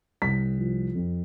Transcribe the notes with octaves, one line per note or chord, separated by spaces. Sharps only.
C2 B6
F3
F2